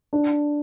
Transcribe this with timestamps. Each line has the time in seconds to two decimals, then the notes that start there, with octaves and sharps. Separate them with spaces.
0.13 D4